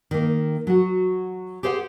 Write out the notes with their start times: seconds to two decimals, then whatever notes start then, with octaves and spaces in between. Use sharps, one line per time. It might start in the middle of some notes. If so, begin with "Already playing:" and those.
0.11 D#3 A#3
0.67 F#3 F#4
1.63 G4 G#4 C5 E5 F#5